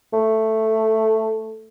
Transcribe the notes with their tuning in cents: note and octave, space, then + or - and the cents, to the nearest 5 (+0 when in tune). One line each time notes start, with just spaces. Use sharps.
A3 +5